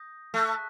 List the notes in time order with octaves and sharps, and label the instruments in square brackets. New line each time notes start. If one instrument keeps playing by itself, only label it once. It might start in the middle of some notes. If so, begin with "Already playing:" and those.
Already playing: [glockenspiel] D#6 G6 A#6
[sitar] A3 [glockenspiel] A5 C#6 F#6 B6